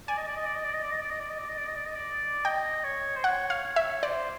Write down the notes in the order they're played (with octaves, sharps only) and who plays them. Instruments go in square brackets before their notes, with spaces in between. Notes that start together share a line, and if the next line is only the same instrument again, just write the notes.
[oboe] D5 [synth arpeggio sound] G#5
[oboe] D#5
D5
D#5
D5
D#5
D5
D#5
D5
D#5
D5
D#5
D5
D#5
D5
D#5
D5
D#5
D5
D#5
D5
[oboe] D#5 [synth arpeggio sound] G5
[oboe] C#5
C5
[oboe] C#5 [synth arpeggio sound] F#5
[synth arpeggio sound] F5
[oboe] C#5
[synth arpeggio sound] E5
[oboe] C5 [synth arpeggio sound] D5